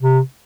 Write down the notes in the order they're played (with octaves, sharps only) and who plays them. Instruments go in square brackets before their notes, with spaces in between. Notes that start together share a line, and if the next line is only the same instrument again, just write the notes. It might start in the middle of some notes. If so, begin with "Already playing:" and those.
[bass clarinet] C3